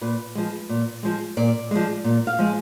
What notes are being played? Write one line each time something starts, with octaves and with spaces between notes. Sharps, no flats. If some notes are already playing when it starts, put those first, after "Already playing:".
A#2 B4
F3 G#3
A#2
F3 G#3
A#2 D5
F3 G#3
A#2
F5
F3 G#3